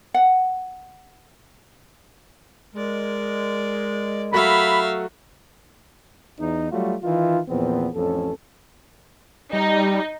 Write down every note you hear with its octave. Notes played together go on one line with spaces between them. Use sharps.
F#5
G#3 A#4 D5
F#3 A3 F#4 E5 F5 B5
E2 D#4
F#3 G3 A3 F4 F#4
D#3 E3 D#4 F4
E2 A#2 F3 B3 C4
A1 F2 C#4 A4
G3 D#4